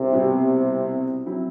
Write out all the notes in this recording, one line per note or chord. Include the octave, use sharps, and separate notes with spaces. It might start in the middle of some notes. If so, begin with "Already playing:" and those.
Already playing: C2 C3
B2 G3 C4 E4
F#3 C4 E4